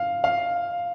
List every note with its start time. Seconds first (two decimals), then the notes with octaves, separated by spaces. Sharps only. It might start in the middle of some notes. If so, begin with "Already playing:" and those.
Already playing: F5
0.24 F5